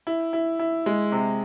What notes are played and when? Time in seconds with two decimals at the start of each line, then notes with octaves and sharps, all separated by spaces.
0.07 E4
0.33 E4
0.59 E4
0.86 G#3
1.12 C3